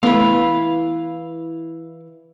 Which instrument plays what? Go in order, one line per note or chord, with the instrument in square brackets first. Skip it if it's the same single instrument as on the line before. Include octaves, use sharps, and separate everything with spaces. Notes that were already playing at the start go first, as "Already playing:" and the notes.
[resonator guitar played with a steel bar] E3 B4 [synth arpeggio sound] A3 B3 [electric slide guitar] E4 F5